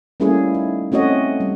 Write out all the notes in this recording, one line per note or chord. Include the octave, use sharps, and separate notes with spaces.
G3 A3 A#3 C#4 E4 G#4
D#4
A3 C4 C#4 F#4 C#5 D#5
G3